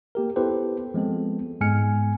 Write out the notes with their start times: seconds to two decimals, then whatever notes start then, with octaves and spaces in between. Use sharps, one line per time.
0.15 A#3 G4 A#4
0.36 B3 E4 G4 A4 B4 C5
0.94 F3 G#3 B3 C4 A4
1.61 G#2 G#3 B3 G#5 F6 C#7